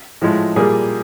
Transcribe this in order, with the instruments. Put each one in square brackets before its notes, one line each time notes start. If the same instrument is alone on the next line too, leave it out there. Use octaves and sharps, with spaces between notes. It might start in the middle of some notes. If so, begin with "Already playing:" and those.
[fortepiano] A2 F3 G#3
A#2 G3 A#3 G#4